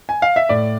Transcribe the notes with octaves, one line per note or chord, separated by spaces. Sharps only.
G#5
F5
E5
A2 D5